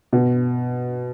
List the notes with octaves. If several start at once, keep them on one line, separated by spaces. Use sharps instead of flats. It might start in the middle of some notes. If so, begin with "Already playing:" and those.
B2